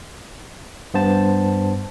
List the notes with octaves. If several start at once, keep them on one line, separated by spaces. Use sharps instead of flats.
G2 B3 C5 A5